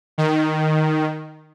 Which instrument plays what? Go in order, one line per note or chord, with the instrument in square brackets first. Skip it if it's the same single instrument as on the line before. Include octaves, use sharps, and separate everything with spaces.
[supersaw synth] D#3